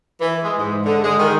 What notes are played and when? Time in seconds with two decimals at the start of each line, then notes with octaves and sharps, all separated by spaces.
0.20 E3
0.43 G#3
0.59 G#2
0.86 D3
1.04 G#3
1.19 D#3